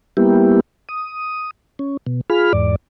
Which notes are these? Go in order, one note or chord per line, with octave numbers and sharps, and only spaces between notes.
G3 A#3 B3 E4 G4
D#6
C#4
B2
F4 G#4 B5 F6
E2 G#2 D5